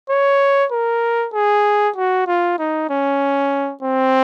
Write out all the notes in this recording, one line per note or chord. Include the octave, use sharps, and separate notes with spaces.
C#5
A#4
G#4
F#4
F4
D#4
C#4
C4